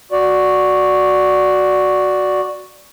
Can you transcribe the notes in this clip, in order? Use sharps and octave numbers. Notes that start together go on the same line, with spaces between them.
F#4 D5